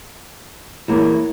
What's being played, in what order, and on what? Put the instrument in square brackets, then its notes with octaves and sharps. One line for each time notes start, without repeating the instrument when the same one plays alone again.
[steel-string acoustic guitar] E2 A#3 C#5 [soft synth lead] E4